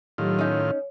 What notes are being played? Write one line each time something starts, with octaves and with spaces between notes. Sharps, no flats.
A2 D#3 F#3 F4 G4 C#5
C#4 D#4 C#5